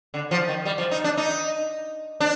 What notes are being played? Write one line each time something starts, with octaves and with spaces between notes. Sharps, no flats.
D3
F3
D#3
G3
F3
D#4
D4
D#4
D4